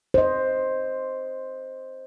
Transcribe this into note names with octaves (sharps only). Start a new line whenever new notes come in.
C5 D#5